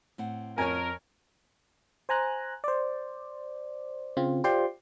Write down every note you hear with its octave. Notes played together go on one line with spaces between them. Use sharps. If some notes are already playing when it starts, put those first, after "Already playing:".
A2 C4 F#5
F2 A#4 C#5 G#5
C5 G#5 A#5 F#6
C5 D5
C#3 C4 F4
F4 G4 C5 D5 G5 C6